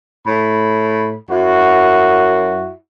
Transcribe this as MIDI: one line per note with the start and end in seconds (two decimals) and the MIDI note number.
0.27 1.14 45
0.27 1.14 83
1.30 2.74 42
1.30 2.74 64
1.30 2.74 66